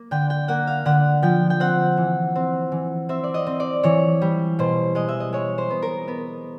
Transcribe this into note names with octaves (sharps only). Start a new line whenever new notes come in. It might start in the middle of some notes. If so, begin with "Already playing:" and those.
Already playing: A#3
D3 G5
G5
A#3 F#5
F5
D3 F#5
F3 G5
G5
C4 F#5
E3
C4
E3
C4 E5
D5
D#5
C4
D5
E3 C#5
G3
B2 C5
G#3 D#5
E5
D#5
G#3 C#5
C5
B3
A#4
B3